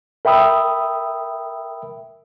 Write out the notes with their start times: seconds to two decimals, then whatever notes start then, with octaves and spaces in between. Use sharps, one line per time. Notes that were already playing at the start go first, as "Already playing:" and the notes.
0.25 A#4 E5 G5 B5 D#6 E6